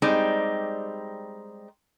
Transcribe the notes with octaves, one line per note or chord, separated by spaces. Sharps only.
G3 G#3 C4 D#4 G4 D5